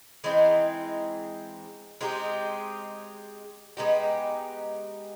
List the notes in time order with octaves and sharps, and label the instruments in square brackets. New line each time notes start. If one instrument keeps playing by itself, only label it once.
[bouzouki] E3 G#3 C4 D#4
G#3 C4 D#4 G4
G#3 B3 D#4 G4